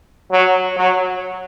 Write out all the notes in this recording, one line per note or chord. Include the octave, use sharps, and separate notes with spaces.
F#3
F#3